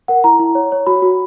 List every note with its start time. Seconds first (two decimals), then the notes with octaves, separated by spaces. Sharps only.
0.08 A#4 F#5
0.24 E4 A#5
0.39 E4
0.55 C#5
0.72 C#5
0.87 F#4 B5
1.02 F#4